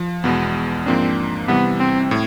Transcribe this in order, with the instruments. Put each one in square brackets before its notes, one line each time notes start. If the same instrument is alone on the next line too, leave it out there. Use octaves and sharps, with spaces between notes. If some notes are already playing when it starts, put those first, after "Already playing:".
Already playing: [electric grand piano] F3
[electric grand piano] E2 B2 G#3 [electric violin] B3
[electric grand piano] G#2 F3 A#3 D4 [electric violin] C4
[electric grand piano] C3 E3 G3 [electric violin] B3
[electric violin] C4
[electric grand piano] A2